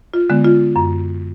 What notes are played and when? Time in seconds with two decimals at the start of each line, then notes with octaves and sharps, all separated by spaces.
0.14 F4
0.30 D3 G#3 B3
0.44 F4
0.76 F#2